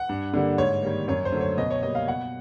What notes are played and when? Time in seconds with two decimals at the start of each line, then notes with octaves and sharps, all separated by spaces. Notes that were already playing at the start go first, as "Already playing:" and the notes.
Already playing: F#5
0.09 G2
0.34 D3 G3 A#3
0.58 G#2 C#5
0.83 D#3 G3 A#3
1.08 F#2 C#5
1.25 C5
1.32 D3 F#3 A3
1.41 C#5
1.58 B2 D#5
1.70 C#5
1.83 G3 A#3 D#5
1.95 F5
2.08 B2 F#5